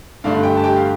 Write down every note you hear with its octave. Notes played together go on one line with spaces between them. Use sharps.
G2 D3 A3 D4 F5
G4 G5
A5
G4 G5
F5